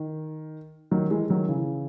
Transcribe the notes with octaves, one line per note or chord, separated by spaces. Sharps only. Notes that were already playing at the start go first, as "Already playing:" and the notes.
Already playing: D#3
D#3 F#3
E3 G#3
D#3 F#3
C#3 E3